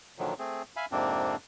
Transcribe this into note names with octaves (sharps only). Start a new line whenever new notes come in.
A#2 D3 D#3 F3 F#3
A3 C4 G#4
E5 F5 G#5 B5
F2 G#2 C3 A#3 C4 D4